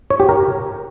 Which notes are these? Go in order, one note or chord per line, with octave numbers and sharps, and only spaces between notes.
C#5
G4
A#4